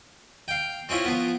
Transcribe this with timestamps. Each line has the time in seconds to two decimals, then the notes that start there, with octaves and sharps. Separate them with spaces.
0.48 F5 G5
0.89 C4 C#4 E4 F4
1.05 F3 B3